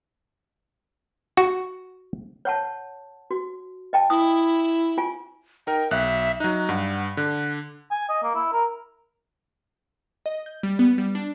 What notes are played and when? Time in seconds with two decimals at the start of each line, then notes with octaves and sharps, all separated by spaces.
1.37 F#4
2.45 C#5 F#5 A5
3.31 F#4
3.93 D#5 G5 A5
4.10 E4 D#6
4.98 F4 G#5
5.67 D#4 A#4 G5
5.91 B1 E5 F#6
6.40 F#3 D#4 F#6
6.69 G2 F#5
7.17 D3 F#6
7.91 G#5
8.09 D#5
8.23 A#3
8.35 E4
8.52 A#4
10.26 D#5
10.46 G6
10.63 G3
10.79 B3
10.98 G3
11.15 D4